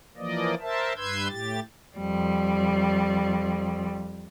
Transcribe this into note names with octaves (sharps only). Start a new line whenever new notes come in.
E3 F3 A#3 D5 D#5
A#4 C5 E5 A5
G2 B4 C6 E6 G6 G#6
A2 G4 A6
F2 G3